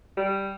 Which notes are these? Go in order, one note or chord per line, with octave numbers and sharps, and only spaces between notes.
G3